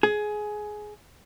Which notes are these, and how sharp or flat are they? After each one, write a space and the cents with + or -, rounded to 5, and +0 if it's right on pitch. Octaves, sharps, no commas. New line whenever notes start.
G#4 +15